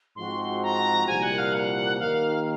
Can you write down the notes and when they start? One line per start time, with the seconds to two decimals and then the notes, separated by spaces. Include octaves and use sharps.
0.16 G#2 F3 C4 F#4 C6
0.62 A#5
1.07 C2 A#2 F3 A#3 G#5
1.23 F#5
1.38 F5
1.53 F#5
1.98 D#2 D#3 A#3 F5